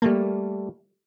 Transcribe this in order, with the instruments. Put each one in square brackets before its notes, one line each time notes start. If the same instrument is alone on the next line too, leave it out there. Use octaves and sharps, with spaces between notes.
[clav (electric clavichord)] G3 A3 A5 [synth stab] A#3